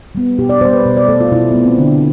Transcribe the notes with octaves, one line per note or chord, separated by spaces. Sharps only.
G3 B3
B2 G4
D5
G3 B3 C5
B4
B2
D5
A3 A4
F4
B2 E4
A3 B3
C4
D3 D4